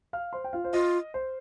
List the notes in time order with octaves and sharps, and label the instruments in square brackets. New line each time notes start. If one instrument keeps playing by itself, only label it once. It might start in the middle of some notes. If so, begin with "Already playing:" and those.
[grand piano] F5 F6
C5 C6
G5
F4 F5
C5
[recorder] F4 [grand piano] D#5
[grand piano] C5